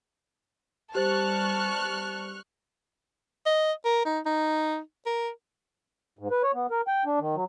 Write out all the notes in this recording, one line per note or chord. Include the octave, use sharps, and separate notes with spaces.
G3 G4 C5 A5 C#6 F6 F#6 A6
D#5
A#4
D#4
D#4
A#4
G#2
B4
C#5
B3
A#4
G5
D4
D#3
F#3